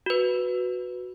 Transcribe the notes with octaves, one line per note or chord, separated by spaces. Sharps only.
F#4 B4